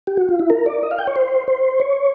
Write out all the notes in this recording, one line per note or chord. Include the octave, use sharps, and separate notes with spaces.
G4
F#4
F4
E4
A#4
D5
D#5
F5
G5
C#5
C5
C5
C#5